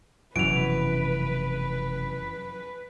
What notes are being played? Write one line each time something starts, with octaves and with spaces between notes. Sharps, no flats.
F1 F#2 B2 E3 B4 D7 F7